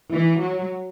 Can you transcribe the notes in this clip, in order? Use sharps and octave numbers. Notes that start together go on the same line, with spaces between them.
E3
F#3